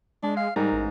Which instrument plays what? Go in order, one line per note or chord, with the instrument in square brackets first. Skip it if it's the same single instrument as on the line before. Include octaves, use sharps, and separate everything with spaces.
[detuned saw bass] G#3 [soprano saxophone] D4
[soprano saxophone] F5
[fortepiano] G#2 [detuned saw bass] G3 [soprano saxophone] A#4
[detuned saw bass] A1